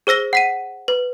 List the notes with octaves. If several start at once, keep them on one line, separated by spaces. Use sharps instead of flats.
G#4 C5 E6 A#6 G7
F#5 B6 D#7
B4